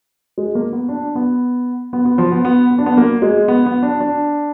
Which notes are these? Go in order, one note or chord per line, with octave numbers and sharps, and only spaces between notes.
G#3
A#3
B3
D4
B3
B3
B3
F3
B3
B3
B3
D4
B3
A#3
G#3
B3
B3
D4
D4